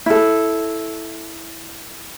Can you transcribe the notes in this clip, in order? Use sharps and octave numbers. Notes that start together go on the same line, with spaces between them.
E4 A4